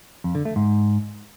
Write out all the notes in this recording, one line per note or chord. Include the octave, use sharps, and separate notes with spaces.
F2
D3
A3
G#2